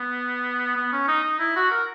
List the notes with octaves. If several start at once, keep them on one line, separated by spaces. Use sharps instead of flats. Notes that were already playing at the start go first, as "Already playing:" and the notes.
Already playing: B3
B3
C#4
D#4
D#4
E4
F#4
A#4